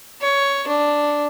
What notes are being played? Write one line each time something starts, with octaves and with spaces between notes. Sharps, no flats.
C#5
D4